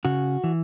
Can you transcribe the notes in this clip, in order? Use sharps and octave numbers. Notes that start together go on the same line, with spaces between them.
C#3 F#4
E3